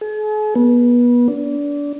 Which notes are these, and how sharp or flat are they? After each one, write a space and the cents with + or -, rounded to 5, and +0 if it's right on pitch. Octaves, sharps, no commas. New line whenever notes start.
G#4 +45
B3 -30
D4 -25